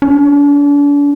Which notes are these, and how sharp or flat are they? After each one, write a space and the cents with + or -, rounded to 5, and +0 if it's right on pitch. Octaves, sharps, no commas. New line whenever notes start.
D4 -40